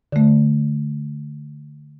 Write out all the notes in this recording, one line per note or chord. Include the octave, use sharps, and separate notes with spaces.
D3 A3